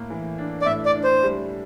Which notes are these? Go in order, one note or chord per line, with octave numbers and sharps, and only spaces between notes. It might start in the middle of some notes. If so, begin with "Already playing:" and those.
Already playing: A2 A#3
E3
D4
D5
A2 E5
D5
D4
C5
G3